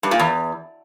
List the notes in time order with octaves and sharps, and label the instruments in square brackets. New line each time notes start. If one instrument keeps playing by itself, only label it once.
[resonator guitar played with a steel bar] G2
A#2
E2